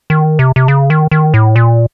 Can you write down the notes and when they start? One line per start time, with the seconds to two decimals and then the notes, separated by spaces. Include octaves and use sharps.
0.10 D#3
0.39 C3
0.56 C3
0.68 C#3
0.90 D#3
1.11 D#3
1.34 A2
1.56 A#2